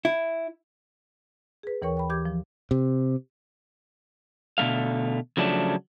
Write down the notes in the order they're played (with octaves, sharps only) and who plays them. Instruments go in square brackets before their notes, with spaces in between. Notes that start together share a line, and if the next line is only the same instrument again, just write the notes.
[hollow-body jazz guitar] E4
[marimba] G#4 B4
D#2 E3 A#4 C#5 G5 C#6
G5 B5
E3 G4 D6 G6 G#6
F3
[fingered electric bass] C3
[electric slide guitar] B2 D3 A3 F5
C#3 F3 F#3 A3 D4